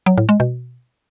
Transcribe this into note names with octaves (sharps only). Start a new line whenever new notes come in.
F#3
A2
G#3
B2